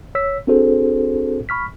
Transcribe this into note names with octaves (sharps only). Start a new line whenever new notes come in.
C#5 E6 B6
C4 D4 F#4 G#4 A4 C5
B5 C#6 F6 B6